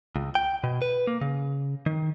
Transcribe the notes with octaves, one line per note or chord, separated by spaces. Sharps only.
C#2
G5
B2
B4
A#3
C#3
D#3